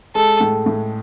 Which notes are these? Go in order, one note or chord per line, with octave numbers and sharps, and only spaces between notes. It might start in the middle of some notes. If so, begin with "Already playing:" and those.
G#3 A4
A2
A2